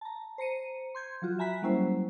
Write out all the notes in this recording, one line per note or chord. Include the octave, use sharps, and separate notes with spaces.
A5 A#5
C5 A#5 C#7 D#7
C6 G6 G#6
F3 F#3 F4 F#4
E5 G#5 A#5 B5 F#6 B6
F#3 G3 A#3 C#4 E4 C5